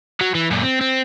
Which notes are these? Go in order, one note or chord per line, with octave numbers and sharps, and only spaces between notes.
F#3
E3
F#2 A#2
C4
C4